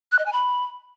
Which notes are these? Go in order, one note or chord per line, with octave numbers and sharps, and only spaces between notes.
F#6
D#5
G#5
B5